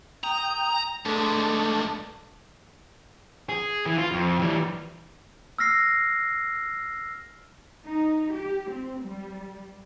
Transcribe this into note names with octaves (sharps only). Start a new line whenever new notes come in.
G5 A#5 D#6
G2 G#3 A3 D4 A4
G#4
E3
F4
F2
E3 G3
E6 F6 A#6 C7
D#4
G4
C4
G3